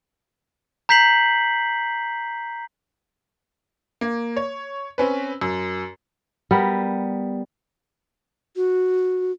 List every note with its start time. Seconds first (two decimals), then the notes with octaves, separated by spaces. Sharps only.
0.89 A#5 G6 B6 C7 F#7
4.01 A#3
4.36 C#5
4.98 C4 C#4 B4
5.41 F#2
6.51 G3 B3 A#4
8.56 F#4